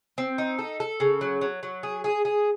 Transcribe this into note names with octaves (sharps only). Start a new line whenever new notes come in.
C4
D#4
A4
A4
C#3
F#3
F#3
F#3
G#4
G#4
G#4